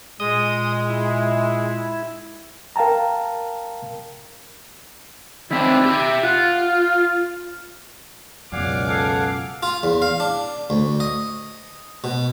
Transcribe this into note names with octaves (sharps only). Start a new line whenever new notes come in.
A#2 G#3 D#5 D#6
E4
A#4 F5 G5 A5 A#5
D#3 C4 D4 E4
G4 E5
F4 F#5
F5
C#2 F#2 B2 D5 F5 F#5 G#5 D6
A4 F#5 G#5
F4
E2
F5
D4
D2
D#5
B2